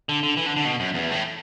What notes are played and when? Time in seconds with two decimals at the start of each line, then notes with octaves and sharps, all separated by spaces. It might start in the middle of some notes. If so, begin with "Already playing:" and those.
0.09 D3
0.23 D3
0.37 E3
0.46 D3
0.56 D3
0.65 B2
0.80 F#2
0.94 E2
1.12 A2